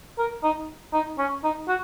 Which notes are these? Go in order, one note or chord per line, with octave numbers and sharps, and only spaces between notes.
A#4
D#4
D#4
C#4
D#4
F#4